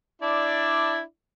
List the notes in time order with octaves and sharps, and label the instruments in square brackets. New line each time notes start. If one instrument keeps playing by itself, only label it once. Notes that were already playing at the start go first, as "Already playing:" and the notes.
[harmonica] D4 E4 D5